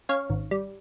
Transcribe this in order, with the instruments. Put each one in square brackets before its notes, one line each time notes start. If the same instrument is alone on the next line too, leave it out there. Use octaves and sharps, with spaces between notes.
[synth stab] C#4 C#5 F5
G#1
G3